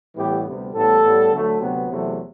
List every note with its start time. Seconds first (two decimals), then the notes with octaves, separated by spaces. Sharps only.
0.16 A1 A2 E3 G3 B3 G4
0.44 D2 C3 G3 B3
0.73 A1 A2 G3 B3 A4
1.02 A2 G3 B3
1.31 D2 D3 F#3 A3
1.59 D2 C3 F#3 B3
1.87 E2 C3 F#3 A3